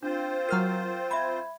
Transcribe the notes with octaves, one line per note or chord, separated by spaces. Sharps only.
C4 D4 F4 C5
F#3 A#4 F6 C7
E5 B5 G#6